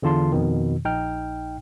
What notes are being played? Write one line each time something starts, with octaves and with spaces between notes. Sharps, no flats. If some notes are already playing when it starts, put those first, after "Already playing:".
E2 D3 F4 A5 C6
F2 B2 D#3
A#1 D#4 G5 F6